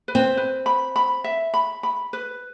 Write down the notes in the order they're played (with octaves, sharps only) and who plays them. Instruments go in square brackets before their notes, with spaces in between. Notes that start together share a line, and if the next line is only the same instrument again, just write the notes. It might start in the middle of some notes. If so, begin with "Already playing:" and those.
[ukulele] B4
[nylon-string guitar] C4
[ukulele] B4
B5
B5
E5
B5
B5
B4